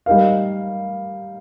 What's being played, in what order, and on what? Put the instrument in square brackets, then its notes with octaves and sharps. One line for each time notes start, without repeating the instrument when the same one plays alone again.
[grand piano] G3 D#4 A#4 F5